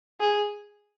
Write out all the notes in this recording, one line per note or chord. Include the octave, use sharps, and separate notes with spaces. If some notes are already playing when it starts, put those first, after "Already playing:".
G#4